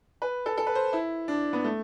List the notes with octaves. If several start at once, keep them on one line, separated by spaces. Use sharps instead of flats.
B4
A4
A4
B4
C5
E4
D4
B3
A3